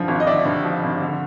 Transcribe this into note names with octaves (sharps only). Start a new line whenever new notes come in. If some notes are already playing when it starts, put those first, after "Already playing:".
Already playing: G2 D3 F3
G#1
D#5
D3 D5 E5
G2
F3
G#1
D3